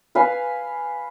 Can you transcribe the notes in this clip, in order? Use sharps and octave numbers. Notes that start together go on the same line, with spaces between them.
B4 F5 G#5